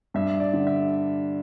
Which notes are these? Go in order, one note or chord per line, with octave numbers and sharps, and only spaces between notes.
G2 E5
D5
D3
E5